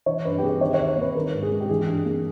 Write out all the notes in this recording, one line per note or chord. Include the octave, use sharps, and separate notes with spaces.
E3 C#5
G2 B4
G4
A#3 G#4
D#3 C#5
D#2 C#5
C#5
A#3 B4
D#3 A#4
G#2
G#4
G#3
G4
E3 G#4
G2
A#3